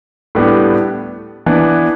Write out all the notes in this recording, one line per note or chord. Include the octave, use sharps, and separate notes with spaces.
A2 G3 B3 D4 G4
E3 B3 D4